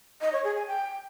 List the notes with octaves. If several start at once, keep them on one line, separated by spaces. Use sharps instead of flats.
D#5
C#5
G#4
G#5
G5